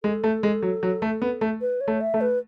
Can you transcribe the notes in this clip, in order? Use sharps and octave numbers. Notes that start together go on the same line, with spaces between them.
G#3 A4
A3
G#3
F#3
F#3
A3
B3
A3
B4
C#5
A3
E5
A3
B4